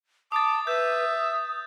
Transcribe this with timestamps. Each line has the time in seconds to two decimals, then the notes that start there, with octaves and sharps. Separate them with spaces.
0.32 A5 D6 D#6 A6
0.67 B4 E5 G6
1.13 D#6